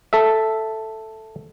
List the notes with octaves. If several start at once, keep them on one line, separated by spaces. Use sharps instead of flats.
A4 E5